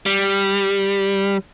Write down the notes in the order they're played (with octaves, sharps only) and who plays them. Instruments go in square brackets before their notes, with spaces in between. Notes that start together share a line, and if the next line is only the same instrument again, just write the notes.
[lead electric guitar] G3